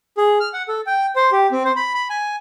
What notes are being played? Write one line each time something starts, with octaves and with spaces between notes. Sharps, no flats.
G#4
F6
F#5
A4
G5
C5
G4
C4
C5
B5
B5
G#5